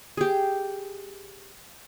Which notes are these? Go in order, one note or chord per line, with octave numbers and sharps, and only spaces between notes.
G4 G#4